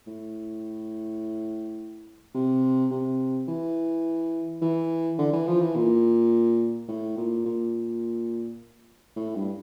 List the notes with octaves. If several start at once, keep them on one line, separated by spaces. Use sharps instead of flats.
A2
C3
C3
E3
E3
D3
E3
F3
E3
A#2
A2
A#2
A#2
A2
G2